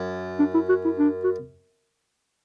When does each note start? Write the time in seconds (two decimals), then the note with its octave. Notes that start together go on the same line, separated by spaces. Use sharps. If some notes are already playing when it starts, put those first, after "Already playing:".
Already playing: F#2
0.39 D4
0.54 E4
0.69 F#4
0.85 E4
0.99 D4
1.24 F#4